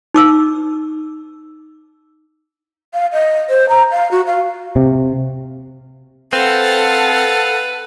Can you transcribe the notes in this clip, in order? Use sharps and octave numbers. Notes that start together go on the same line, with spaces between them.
D#4 D6 E6
F5
D#5
C5
A#5
F5
F#4
F5
C3
C4 A4 B4 F5 F#5